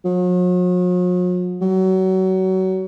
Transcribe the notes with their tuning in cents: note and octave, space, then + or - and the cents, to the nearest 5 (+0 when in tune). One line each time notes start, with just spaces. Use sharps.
F#3 -45
F#3 +25